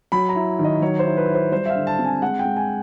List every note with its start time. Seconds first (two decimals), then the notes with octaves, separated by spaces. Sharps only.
0.12 F#3 B5
0.29 A#5
0.35 E4
0.59 D#3
0.64 D#5
0.82 F#3 C#5
0.99 C5
1.05 E4
1.17 B4
1.29 E4
1.34 C5
1.52 G3 C5
1.65 E5
1.70 F5
1.75 D3
1.87 A5
1.99 C4
2.05 G#5
2.22 G#3 F#5
2.39 G5
2.45 G#3
2.56 G#5